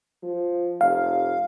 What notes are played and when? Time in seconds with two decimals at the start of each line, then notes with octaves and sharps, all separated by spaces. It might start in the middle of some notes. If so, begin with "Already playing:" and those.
0.23 F3
0.81 F1 F5